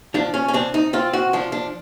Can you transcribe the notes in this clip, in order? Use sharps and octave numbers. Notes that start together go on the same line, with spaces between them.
F3 D4
C#4
C#4
C4 D4
D#4
C4 F4
F#4
F3 D4
D4